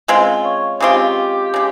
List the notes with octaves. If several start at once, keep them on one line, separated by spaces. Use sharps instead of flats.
C#3 G#3 C4 F4
C#5
C#3 G#3 C4 F4 G4
C#3 G#3